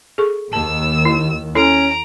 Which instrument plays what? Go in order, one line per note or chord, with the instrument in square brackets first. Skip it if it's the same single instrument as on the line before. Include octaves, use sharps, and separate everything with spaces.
[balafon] G#4 A4 C#6
[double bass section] D#2 D#3 [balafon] A5 [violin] E6 E7
[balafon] E4
[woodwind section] C#4 [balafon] E4 A4 [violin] A#5 D7